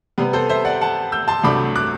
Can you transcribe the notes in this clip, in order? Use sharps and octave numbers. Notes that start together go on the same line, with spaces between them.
C3 G3 B3 B4
A4 C5
C5 E5
D5 F#5
F#5 A5
E6 G6
A5 C6
C2 C3 F#3 A3 D4 B5 D6
D6 F#6